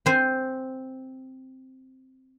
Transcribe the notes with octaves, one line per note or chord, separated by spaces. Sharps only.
C4 C5 G#5